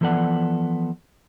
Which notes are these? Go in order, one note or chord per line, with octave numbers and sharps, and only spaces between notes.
E3 F3 B3 A4 D5 F#5